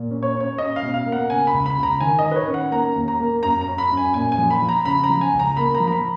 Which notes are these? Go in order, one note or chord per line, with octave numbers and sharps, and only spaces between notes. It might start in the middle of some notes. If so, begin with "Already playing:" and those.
Already playing: A#2
C#4
C#5
C#4
C#5
C#4 D#5
F5
B2
F5
A#3
F#5
C#3 G#5
B5
C#2
B5
C#2
A#5
D#3 G#5
D#5
D#3
B4
C#5
C#4
F#5
A#3 A#5
D#2
A#5
A#3
F#2 A#5
A#5
C#4
B5
F#2
G#5
A#2 G#5
G#5
F3
B5
F3
A#5
C#3 B5
A#5
F3
G#5
C#2
A#5
A#3 B5
A#5
F3
A#5
B5